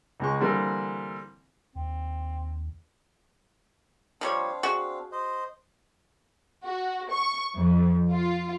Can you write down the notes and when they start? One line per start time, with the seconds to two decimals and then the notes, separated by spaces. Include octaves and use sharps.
0.20 C#2 G#3 C#6
0.40 D3 E3 G3 A#3 C4
1.75 D#2 C4
4.21 F3 G3 C4 D4 C#5 F5
4.63 F#4 G#4
5.12 C5 D#5
6.64 F#4
7.11 C#6
7.56 F2
8.10 F4